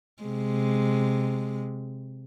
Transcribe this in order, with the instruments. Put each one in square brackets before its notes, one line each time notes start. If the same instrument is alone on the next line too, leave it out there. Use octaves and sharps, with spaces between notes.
[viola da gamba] C3 G#3